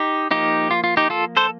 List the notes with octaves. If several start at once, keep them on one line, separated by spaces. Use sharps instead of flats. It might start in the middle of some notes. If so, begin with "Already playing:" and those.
Already playing: D#4 G4
F3 A#3 D#4 G4
F4
F4
D#4 G4
F4 A4
A4 C5